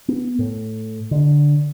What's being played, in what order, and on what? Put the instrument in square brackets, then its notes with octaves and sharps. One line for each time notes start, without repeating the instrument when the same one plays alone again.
[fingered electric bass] B3
A2
D3